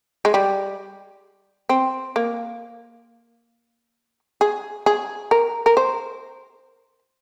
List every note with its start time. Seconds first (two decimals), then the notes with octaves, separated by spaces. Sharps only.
0.25 G#3
0.34 G3
1.69 C4
2.16 A#3
4.41 G#4
4.86 G#4
5.31 A#4
5.66 A#4
5.77 C5